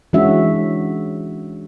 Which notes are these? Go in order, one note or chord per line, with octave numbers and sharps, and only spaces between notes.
E3 G#3 C#4 D4 F#4 E5